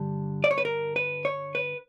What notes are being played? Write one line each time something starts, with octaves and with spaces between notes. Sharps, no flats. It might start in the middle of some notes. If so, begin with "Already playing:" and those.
Already playing: G2 D3 G3
D5
C#5
B4
A#4
B4
C#5
B4